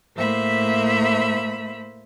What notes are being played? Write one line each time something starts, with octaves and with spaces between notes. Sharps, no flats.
A2 A#3 C5 E5 B5